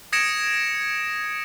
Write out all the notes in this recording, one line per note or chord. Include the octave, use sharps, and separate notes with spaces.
D#6 G#6 A#6 C#7 D7 E7